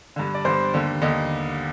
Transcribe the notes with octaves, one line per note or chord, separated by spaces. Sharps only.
G2 D3
D5
G2 D3 C5
D#2 D3
D#2 D3 D#5